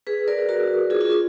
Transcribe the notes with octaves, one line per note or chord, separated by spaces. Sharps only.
G#4 B4
A#4 D5
F#4 A#4
F4 G#4
F4 G#4